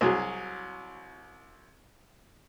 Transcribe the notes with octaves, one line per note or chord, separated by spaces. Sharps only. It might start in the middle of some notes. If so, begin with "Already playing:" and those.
C2 F#3 G#4